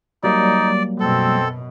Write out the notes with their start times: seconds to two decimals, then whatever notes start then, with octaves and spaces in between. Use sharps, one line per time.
0.24 F#3 G3 A#3 D#4 D5
1.00 F#2 B2 C4 A4